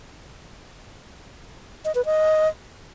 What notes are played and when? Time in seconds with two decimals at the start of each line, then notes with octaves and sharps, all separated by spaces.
1.85 D#5
1.95 B4
2.05 D#5